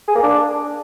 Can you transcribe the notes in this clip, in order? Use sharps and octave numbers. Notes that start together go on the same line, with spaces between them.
G#4
A#3
D4